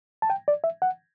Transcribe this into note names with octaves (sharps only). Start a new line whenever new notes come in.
A5
G5
D5
E5
F#5